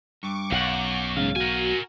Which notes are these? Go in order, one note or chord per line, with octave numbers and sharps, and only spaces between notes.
G2 C#6 D6
B1 F#2 F5 F#5
G#2 C#3 F5
F#4 A#4 G#5